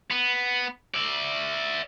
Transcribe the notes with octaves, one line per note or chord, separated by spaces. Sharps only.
B3
D5 E5